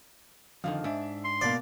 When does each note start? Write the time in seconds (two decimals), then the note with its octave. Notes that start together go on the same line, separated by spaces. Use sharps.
0.64 F2 D3 D#3 F5
0.84 G#2 D4 E5
1.24 C6
1.41 B2 A#3 D5 F5